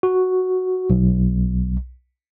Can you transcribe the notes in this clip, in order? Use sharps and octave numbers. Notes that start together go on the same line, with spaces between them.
F#4
B1